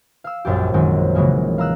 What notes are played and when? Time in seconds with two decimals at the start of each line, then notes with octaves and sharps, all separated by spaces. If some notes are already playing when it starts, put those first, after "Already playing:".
0.24 F5 E6
0.45 A#1 F#2 G3 G4
0.73 F#2 D#3 F#3 G#3 C4
1.15 C#3 E3 F#3 G#3 A#3
1.58 F5 A#5 E6 F#6